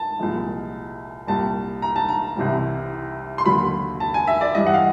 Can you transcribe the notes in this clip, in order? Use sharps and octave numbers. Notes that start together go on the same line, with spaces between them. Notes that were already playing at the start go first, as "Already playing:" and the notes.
Already playing: A5
C2 A#2 F3 G#3
C2 A#2 G3 A5
A#5
A5
A#5
C2 C3 E3 G3
C6
D#2 D3 F#3 B5
A5
G#5
E5
D5
G2 E3 G3 D#5
F#5
F5